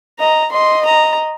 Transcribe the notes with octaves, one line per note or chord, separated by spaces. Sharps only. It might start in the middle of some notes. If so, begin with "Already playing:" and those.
D#5 A#5
D#5 C6
A#5